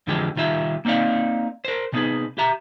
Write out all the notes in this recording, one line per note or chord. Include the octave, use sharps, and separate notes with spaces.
F2 D3 E3 F3 G#3 G4
C2 D#3 F4 G4 E5
A#3 C4 D#4 D5 F5
A#4 C5
C3 G3 B3 D#4 G#4 B4
G4 E5 A#5